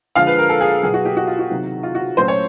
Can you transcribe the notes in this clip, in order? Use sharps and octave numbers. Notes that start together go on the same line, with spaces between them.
D3 F3 G#3 F5
B4
A#4
A4
G#4
G#4
B2 F#3 B3 G#4
F#4
G4
F#4
F4
F#4
C3 D#3 F#3
F4
F#4
A#2 F#3 A3 C#4 C5
C#5